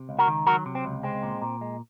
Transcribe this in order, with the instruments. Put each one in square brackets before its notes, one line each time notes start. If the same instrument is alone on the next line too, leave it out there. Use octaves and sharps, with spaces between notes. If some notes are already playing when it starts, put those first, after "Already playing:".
Already playing: [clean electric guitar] C3
C#2
F#4 A#4
D#3
F#3 F#4 A#4
C3
C4
C#2
G#3 C4
A#2
A#2
G#3